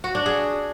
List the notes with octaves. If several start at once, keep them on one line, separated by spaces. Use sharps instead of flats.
F#4
D4
G#4